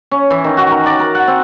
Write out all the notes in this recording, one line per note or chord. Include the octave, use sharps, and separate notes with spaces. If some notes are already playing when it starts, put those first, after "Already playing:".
C#4
E3
D#3
F#4
A#4
D5
A#4
F#5
C4